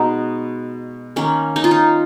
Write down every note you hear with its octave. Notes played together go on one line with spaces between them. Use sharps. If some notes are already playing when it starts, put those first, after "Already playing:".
Already playing: B2 G#3 B3 D#4
D#3 A#3 C#4
D#4
F4
D#4